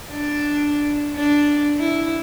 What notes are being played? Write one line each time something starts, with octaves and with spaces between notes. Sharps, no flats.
D4
D4
E4